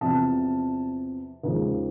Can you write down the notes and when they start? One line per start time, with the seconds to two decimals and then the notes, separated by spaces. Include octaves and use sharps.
0.01 E2 C3 F3 A5
1.43 D#2 C#3 F3 G#3